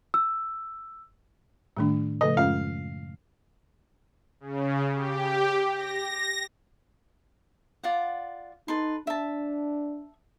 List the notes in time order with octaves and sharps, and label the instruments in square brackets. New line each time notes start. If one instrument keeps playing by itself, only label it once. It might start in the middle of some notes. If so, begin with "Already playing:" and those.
[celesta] E6
[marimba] A2 D#3 [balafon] G3 A3 D4
[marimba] C#3 F3 A3 [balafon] A4 B4 [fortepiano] D#5
[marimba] F#2 [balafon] G#3 C#4 F4 [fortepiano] F5
[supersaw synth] C#3
G4
A#6
[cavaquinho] F4 D5 F#5
[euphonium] D#4 [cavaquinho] A4 B4 C6
[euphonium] D4 [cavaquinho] E5 A5